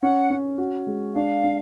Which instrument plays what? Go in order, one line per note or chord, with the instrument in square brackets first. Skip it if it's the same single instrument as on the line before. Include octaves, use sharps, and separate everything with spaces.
[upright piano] C#4 [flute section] F#5
[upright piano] C#4
F#4
G#3
[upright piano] D4 [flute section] F5
[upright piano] D4